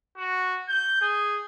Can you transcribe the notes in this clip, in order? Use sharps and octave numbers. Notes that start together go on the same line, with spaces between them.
F#4
G6
G#4